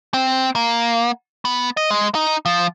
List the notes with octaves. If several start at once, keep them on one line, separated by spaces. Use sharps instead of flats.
C4
A#3
B3
D#5
G#3
D#4
F3